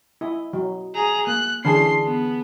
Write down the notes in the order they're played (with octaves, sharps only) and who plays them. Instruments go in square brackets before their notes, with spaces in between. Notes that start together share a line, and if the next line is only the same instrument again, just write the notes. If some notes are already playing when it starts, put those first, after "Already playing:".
[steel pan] E4 [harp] D#5
[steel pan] F#3
[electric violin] G#4 A#5
[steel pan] A#3 [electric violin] F#6
[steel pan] D3 E3 C#4 [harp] G#4 A5 F6 [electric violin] C6 C7
[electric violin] B3